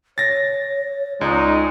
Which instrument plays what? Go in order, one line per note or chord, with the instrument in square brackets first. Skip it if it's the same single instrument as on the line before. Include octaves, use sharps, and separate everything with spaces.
[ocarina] C#5 [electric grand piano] A6 A#6
[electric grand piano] C#2 [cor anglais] G#3 [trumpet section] D#4 [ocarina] D5